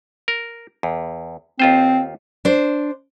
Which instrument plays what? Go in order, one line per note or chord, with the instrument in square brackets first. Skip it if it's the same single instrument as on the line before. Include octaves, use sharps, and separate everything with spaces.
[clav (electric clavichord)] A#4
E2
[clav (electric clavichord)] D#2 F4 C5 [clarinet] C4
[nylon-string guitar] D4 C5